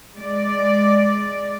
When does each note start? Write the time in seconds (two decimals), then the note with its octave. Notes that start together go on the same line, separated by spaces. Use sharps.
0.17 G#3 D5